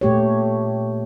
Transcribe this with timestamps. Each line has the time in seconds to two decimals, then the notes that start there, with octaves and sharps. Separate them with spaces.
0.01 A#2 A3 G4 C#5